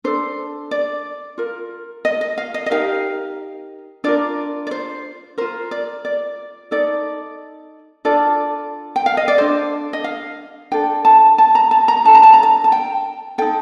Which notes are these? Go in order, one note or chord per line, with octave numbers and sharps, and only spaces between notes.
D4 A4 C5
D5
F4 A#4
D#5
D#5
F5
D#5
D#5
D#4 G4 A#4 F5
D4 F4 A#4 D5
D5
C5
F4 A#4 C5
D5
D5
D#4 A4 D5
D4 F4 A4 D5
G5
F5
D#5
D5
D4 F4 A4 C5
D#5
F5
D4 A4 G5
A5
A5
A#5
A5
A#5
D4 A4 A5
A#5
A5
A#5
A5
A5
G5
D#4 A4 G5